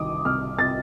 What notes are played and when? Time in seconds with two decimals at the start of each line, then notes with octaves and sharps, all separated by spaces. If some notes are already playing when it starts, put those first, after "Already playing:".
Already playing: C2 D#3 D6 D#6
0.25 C2 F6
0.59 C3 A6